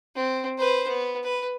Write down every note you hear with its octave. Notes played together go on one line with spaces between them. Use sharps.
C4
B4 C5
B3
B4